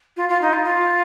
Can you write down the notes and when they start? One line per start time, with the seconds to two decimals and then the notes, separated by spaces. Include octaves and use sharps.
0.16 F4
0.29 F4
0.41 D#4
0.53 F4
0.64 F4